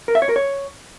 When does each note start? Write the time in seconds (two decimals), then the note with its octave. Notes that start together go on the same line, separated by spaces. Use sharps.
0.08 A#4
0.15 E5
0.22 C#5
0.29 A#4
0.36 C#5